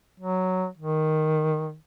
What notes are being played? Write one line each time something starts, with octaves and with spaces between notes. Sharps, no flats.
F#3
D#3